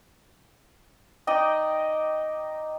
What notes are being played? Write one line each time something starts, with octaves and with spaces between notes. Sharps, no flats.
D#4 D5 D#5 G5